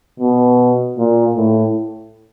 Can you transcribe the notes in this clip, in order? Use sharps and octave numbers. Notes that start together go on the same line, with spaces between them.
B2
A#2
A2